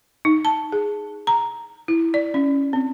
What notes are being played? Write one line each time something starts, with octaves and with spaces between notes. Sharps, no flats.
D#4
A5
G#4
A#5
E4
D5
C#4
C4